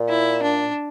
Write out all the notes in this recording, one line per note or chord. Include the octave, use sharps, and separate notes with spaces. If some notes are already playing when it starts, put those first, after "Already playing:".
Already playing: A#2
E4
D4